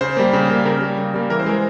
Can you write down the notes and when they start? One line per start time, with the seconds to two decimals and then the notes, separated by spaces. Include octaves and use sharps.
0.01 C#3 C5
0.17 G3 A#3
0.33 C#3
0.49 G3 A#3
0.65 C#3 A#4
0.81 G3 A#3
0.98 C#3
1.14 G3 A#3
1.30 E3 A#4
1.39 C5
1.46 G#3 A#4